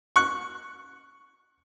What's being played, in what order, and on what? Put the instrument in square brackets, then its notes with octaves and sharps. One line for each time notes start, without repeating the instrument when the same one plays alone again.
[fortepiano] C#6 F#6